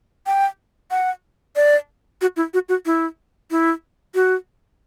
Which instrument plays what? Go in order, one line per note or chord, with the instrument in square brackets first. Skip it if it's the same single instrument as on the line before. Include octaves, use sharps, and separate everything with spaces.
[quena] G5
F#5
D5
F#4
E4
F#4
F#4
E4
E4
F#4